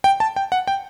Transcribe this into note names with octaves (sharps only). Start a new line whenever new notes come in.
G5
A5
G5
F#5
G5